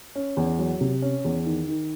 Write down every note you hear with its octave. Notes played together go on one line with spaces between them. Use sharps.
C#4
E2
F#3
C3
C#4
E2
D#3
D#3